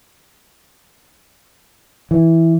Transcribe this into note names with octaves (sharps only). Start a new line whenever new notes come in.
E3